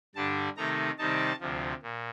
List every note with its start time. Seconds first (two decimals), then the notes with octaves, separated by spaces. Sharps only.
0.15 G2 D3 G3 D4 A5
0.57 C3 D#3 A3 D#4 A#5
0.98 C3 D#3 G3 C4 D#4 A5
1.40 D2 C3 F3
1.82 A#2